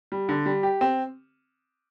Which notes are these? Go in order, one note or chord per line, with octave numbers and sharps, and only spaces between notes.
G3
D3
G3
G4
C4